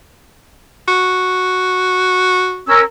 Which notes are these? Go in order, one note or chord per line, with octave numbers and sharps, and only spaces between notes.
F#4
C#4 A#4 E6